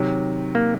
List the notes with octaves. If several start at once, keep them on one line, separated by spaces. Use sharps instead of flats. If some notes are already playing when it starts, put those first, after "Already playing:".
Already playing: C3 D#3 F#3
A#3